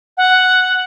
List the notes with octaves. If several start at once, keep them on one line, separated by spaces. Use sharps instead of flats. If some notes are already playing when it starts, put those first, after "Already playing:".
F#5